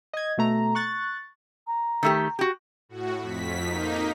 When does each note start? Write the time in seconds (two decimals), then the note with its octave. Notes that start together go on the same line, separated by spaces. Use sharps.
0.13 D#5 G#6
0.37 B2 A3 A#5
0.75 C#6 F#6 A6
1.67 A#5
2.03 D#3 A3 G4
2.39 F#4 G4
2.89 A2 F#4
3.21 F2 B6
3.64 A#3 D#4